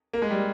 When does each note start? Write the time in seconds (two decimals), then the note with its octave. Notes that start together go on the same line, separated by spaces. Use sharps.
0.13 A#3
0.22 G#3
0.31 G3